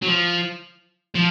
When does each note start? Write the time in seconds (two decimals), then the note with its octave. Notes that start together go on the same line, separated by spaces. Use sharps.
0.02 F#3
0.08 F3
1.15 F3